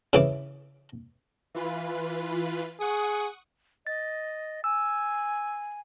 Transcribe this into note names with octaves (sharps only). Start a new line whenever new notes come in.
C#3 E3 D6
E3 F4 B4
G#4 F#5 C#6 D#6
D#5 A6
G#5 E6